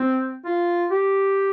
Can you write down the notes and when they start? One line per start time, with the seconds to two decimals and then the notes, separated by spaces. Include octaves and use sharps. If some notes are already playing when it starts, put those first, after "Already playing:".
Already playing: C4
0.45 F4
0.91 G4